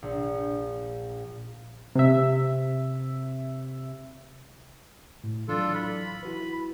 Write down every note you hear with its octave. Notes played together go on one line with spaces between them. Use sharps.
A#1
C3 E5
A2
E3 F#3 D4 F4 A4
B5
E4 F#4 B4